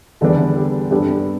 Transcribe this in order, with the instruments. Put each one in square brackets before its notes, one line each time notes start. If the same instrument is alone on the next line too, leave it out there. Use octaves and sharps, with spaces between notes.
[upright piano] E2 D3 G3 B3 D4 A4
G4
G2 G3 B3 D4 A4